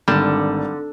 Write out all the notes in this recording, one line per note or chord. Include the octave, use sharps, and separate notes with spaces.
G#1 D3 G3 E7